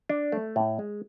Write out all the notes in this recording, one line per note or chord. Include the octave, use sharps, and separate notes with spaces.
D4
A3
A2
G#3